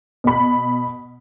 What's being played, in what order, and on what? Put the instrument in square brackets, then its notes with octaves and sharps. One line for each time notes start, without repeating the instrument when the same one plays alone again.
[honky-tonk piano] B2 B5